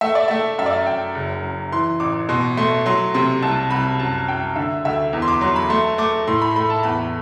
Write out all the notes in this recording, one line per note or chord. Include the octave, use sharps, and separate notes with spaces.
A3 E5
D5
A3 E5
F#2 E5
D5
E5
F#2 G5
F#1
F#2
E3 C6
A1 D6
B2 C6
A3 C6
F#3 C6
C3 C6
C2 A5
C2 B5
F#2 A5
F#2 G5
D3 E5
D2 E5
E2
C6
D6
F#3 C6
B5
A3 C6
A3 D6
A2 C6
B5
A3 B5
A5
E2 B5